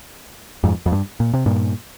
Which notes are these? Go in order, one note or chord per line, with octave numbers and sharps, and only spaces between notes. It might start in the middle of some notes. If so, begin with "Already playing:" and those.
F2 G#2
F2
G2
A#2
C3
G2 A#2